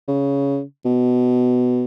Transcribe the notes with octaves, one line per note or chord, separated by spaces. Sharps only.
C#3
B2